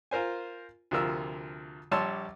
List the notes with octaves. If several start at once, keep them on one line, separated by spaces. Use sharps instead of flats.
F4 A#4 C5 G#5
D2 C3 F3 A#4 E6
A#1 G3 C#5 A5 C6 E6